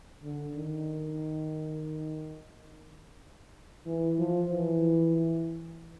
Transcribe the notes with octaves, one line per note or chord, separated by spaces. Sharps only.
D3
D#3
E3
F3
E3